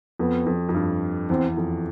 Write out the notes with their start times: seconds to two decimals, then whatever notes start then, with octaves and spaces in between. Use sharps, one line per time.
0.19 F2 B3
0.46 F2
0.69 F2
0.74 G2
1.30 E2 C4
1.57 F2